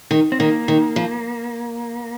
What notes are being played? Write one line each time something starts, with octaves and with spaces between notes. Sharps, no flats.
D#3
C4
D#3 A#3
D#3
F3